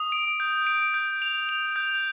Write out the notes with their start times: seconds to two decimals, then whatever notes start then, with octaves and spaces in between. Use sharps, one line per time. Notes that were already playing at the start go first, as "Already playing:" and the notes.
Already playing: D#6
0.12 D7
0.40 G6
0.67 D7
0.94 G6
1.22 F7
1.49 F7
1.76 G6